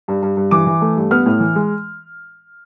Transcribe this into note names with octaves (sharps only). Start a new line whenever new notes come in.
G2
G2
G2
E3 D6
E3
A3
G2
B3 F6
A2
E3
G#3